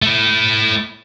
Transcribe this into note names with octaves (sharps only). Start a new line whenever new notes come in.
A3 E4